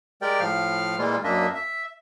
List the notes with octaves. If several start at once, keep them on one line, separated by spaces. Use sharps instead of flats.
G#3 G4 A#4 D5 G5
A2 F3 F5 F6
A#2 E3 G3 G#3 A#3 F4
F#2 A#3 D4 D#5 E5
E5